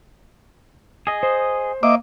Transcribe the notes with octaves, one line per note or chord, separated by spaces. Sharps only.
G#4 D#5
C5
A#3 D#5 E5 D6